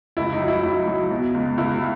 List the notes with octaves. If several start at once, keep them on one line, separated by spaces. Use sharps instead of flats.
C#2 E4
D#4
F#3
E4
F#3 E4
F#3
B2
C#2
C#2 E4